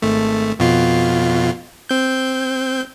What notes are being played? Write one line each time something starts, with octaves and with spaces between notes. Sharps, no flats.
G#1 A3
F2 B2 F4
C4 G6